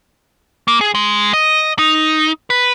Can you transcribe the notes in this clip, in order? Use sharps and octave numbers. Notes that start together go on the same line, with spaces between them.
A#3
G#4
G#3
D#5
D#4
B4